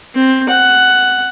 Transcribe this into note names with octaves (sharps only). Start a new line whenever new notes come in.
C4
F#5